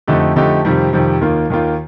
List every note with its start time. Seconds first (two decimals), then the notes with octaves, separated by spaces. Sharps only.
0.07 F2 D3 A3 D#4 G4
0.36 F2 D3 A3 D#4 G4
0.65 F2 C3 D#3 G3
0.93 F2 C3 D#3 G3
1.21 D#2 D#3 A#3 F4
1.50 D#2 D#3 A#3 F4